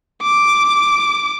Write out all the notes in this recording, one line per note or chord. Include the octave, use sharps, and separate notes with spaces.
D6